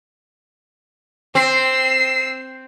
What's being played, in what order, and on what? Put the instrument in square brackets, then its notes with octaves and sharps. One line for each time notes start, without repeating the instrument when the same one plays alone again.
[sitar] C4 [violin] E6 C7